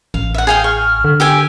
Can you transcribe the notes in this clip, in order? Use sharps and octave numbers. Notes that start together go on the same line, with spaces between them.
A1 F5
E5 F#5
G#4 F5 G5
C#6 F6
D3
G4 G5 G#5 E6